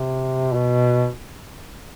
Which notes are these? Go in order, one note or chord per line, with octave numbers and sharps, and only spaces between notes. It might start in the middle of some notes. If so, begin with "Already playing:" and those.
Already playing: C3
B2